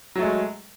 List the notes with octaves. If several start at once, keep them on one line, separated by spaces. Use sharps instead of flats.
F#3 G#3 A3